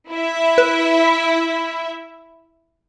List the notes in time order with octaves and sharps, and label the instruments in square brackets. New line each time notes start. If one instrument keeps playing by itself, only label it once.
[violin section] E4 E5
[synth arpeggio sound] B4